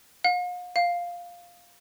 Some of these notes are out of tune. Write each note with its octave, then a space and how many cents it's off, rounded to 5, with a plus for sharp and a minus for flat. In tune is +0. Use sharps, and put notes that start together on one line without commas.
F5 +45
F5 +5